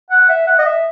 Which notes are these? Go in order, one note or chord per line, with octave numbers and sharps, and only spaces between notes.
F#5
E5
F#5
D#5
E5